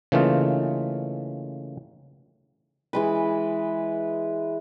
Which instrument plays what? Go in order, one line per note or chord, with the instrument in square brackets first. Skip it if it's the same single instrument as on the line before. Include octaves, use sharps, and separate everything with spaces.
[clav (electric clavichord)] C#3 E3 A3 A#3 D#4 F4
[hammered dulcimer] E3 G#3 B4